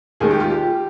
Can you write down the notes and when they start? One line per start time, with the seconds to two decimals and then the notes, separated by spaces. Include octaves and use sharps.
0.20 D#2 D#3 G#3 G#4
0.31 G4
0.40 F4
0.50 G4